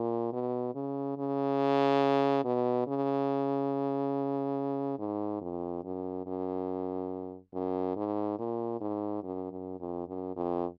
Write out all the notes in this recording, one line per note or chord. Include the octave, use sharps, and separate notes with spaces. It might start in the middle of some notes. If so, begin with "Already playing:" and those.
Already playing: A#2
B2
C#3
C#3
B2
C#3
G#2
F2
F#2
F#2
F#2
G#2
A#2
G#2
F#2
F#2
F2
F#2
F2